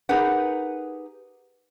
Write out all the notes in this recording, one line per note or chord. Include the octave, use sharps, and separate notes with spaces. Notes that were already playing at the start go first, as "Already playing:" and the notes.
D#4 G4 G#4 A#4 B4 F#5